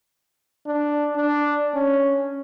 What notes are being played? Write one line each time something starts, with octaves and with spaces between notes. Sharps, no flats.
D4
D4
C#4